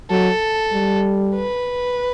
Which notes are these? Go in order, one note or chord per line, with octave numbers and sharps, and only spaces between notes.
F#3 A4
G3
B4